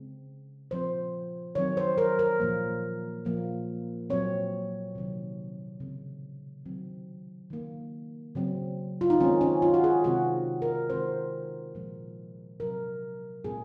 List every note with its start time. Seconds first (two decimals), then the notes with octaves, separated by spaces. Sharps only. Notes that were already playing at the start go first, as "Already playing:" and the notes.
Already playing: C#3 G#3 C4
0.70 A#2 F3 C4 C5
1.55 D#3 F#3 C4 C#5
1.77 C5
1.98 A#4
2.19 A#4
2.40 A#2 F3 A#3
3.25 A#2 F3 A#3
4.10 A#2 F#3 C4 C#5
4.95 C3 D#3 F#3
5.80 C#3 G#3 C4
6.66 D#3 F#3 C4
7.50 D#3 A#3
8.35 C#3 F#3 C4
9.01 F4
9.10 D#4
9.20 D#3 G#3 C4 C#4
9.41 C#4
9.62 F4
9.74 F#4
9.84 G#4
10.04 C3 D#3 G#3 C4 F#4
10.62 A#4
10.90 D#3 G#3 C4 C5
11.75 A#2 F3 G#3
12.60 C3 F#3 C4 A#4
13.44 A#2 G#3 C4 G#4